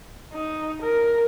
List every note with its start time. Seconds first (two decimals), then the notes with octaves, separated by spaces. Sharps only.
0.33 D#4
0.82 A#4